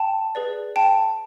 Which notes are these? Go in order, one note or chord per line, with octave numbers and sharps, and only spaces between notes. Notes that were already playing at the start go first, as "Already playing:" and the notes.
Already playing: G5 A5
G#4 B4 D5
G5 A5